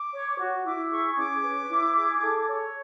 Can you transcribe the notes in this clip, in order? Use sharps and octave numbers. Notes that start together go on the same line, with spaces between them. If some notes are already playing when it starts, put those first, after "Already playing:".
Already playing: D6
C#5
F#4
E4 D6
G#4 C#6
C#4 D6
B4
E4
G#4
A4
C#5